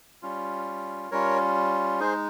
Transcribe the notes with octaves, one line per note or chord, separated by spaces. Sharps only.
G3 C#4 F4
G3 C#4 F4 A#4 C#5
G#3 D#4 G#4 C5